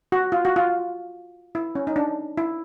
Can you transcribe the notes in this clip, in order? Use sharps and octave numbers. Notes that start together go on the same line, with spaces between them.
F#4
F4
F#4
F4
E4
C#4
D#4
D4
E4